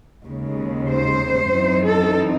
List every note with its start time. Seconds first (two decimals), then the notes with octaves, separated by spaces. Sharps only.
0.24 D#2 C#3 G#3
0.90 C5
1.54 F#2 E3 C4 D#4
1.86 A4